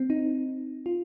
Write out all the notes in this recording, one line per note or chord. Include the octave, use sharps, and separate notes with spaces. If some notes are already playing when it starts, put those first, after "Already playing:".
Already playing: C4
D#4
F4